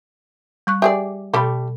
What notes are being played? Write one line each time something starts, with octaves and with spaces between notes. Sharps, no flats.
G3 C#6 F#6
G4 G#4 D5 E5
B2 G3 A3 G4 B5